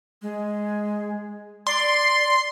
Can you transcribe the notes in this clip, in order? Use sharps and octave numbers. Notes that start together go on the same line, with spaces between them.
G#3
D5 C6